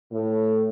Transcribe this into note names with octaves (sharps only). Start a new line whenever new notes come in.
A2